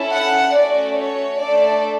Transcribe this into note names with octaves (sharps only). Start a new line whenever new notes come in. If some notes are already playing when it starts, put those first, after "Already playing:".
Already playing: C#4 E4 A4
F#5
A3 C#4 F#4 A4 D5
C#5
A3 D4 A4 D5